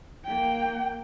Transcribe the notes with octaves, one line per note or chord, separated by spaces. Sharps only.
A#3 G5